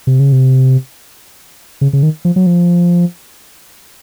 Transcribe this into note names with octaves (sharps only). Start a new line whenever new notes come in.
C3
C#3
C3
C#3
C#3
D#3
F3
F#3
F3